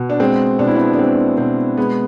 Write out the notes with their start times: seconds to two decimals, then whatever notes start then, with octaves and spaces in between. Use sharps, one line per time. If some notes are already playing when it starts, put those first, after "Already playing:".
Already playing: B2
0.10 D4
0.20 G#3 C4
0.59 B2 D4
0.67 E4
0.75 B3 D4
0.93 D4
0.99 G#3 C4
1.38 B2 C4
1.77 G#3 B3